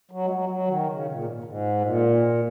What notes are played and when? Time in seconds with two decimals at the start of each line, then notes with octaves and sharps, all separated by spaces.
0.11 F#3
0.26 G#3
0.30 F#3
0.49 F#3
0.68 D#3
0.87 C#3
1.06 A#2
1.24 G#2
1.44 G#2
1.81 A#2